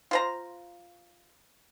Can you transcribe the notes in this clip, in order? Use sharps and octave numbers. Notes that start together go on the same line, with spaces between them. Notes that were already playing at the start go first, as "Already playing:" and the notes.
F4 C5 A#5